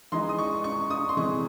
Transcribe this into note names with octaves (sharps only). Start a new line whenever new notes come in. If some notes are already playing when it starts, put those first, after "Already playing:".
E3 G#3 D#4 C6
D#6
C#6
C#6
D#6
C6
C3 E3 G#3 C#6